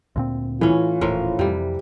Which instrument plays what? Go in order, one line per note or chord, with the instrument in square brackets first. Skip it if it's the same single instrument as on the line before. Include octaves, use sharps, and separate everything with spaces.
[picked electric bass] D2 A#2 C4
[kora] A2 C#4 [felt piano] E3 [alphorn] F4
[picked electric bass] D#1 [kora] A2 F3 A#4
[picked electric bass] F2 [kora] C3 G3